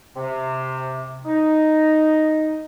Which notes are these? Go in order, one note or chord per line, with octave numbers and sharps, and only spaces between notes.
C3
D#4